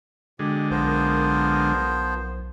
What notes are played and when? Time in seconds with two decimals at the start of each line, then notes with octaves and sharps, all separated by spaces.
0.39 B2 D3 G#3 G4
0.70 B1 F3 B3 A#4 C5